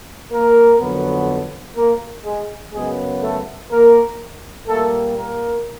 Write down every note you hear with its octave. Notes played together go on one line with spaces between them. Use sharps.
A#3 A#4
F2 D3 F#3 B3
A#3 A#4
G#3 G#4
F#2 C#3 F#3 G#3 B3 G#4
A3 A4
A#3 A#4
A#2 G3 A3 A#3 A4
A#3 A#4